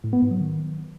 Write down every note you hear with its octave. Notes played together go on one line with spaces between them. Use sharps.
A2
B3
G#2
F#3
D#3